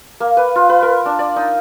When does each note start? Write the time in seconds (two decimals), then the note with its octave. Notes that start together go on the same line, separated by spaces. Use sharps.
0.20 A#3
0.37 B4
0.55 F4
0.69 B4
0.82 A#4
1.06 D4
1.19 D5
1.36 D#4